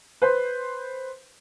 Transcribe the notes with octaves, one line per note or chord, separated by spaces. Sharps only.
B4 C5